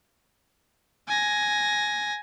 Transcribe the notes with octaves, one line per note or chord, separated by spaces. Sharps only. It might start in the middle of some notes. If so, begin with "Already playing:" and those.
G#5 A#6